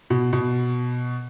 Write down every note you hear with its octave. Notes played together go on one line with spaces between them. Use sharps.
B2
B2